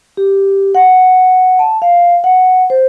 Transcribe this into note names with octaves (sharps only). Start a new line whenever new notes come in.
G4
F#5
A5
F5
F#5
C5